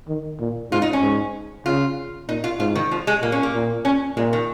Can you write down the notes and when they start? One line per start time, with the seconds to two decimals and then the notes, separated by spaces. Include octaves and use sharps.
0.08 D#3
0.40 A#2
0.71 G#2 F4
0.82 D#4
0.93 C#4
1.02 G#2
1.66 C#3 F4
2.29 A#2 D#4
2.44 F4
2.60 G#2 F4
2.75 D#3
2.91 F3
3.07 G#3
3.22 A#2 A#3
3.32 C#4
3.43 A#3
3.54 A#2
3.85 C#4
4.17 A#2 G#3
4.33 D#3